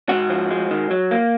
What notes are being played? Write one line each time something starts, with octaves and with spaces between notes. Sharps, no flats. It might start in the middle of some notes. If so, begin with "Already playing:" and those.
G#2 F#4
F3
G#3
D#3
F#3
A#3